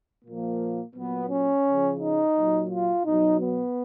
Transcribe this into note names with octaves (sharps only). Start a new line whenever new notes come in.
A#2 F3 A#3
A#2 F#3 B3
C#4
C#3 F3
D#4
A#2 F#3
F4
B2 F#3 D#4
B3